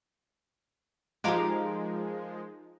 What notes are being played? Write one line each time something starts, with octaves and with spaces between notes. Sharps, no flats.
F3 G#3 D#4 F4 G4 A#4 F5 D6